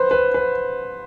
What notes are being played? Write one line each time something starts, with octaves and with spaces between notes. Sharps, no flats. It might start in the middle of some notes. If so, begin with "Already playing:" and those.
Already playing: B4 C5
B4
B4